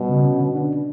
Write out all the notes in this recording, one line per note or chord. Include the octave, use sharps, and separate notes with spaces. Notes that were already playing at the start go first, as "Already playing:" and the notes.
Already playing: B2 G3
C#3
C#4
D3
D4